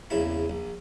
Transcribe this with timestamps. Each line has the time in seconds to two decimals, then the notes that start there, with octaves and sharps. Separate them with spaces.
0.10 A#1 E2 C#3 E4 B5
0.50 A#1